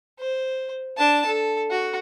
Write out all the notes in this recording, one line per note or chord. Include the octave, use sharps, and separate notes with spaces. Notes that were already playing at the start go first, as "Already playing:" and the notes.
C5
D4 A5
A4
F#4